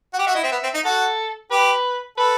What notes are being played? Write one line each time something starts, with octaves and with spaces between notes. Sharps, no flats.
F#4
G4 F#5
F#4 E5
E4 D#5
C4 E5
B3
C4
D#4
F#4 A4
G4 B4
A4 B4